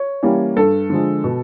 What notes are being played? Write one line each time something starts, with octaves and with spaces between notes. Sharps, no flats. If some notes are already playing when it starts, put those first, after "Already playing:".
Already playing: C#5
E3 G3 A#3 C#4
G2 A4
D3 F3 G#3
B2